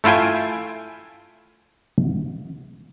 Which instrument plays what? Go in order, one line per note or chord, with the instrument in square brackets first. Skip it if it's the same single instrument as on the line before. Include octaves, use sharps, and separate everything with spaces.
[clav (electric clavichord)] A3 E4 F4 G5 G#5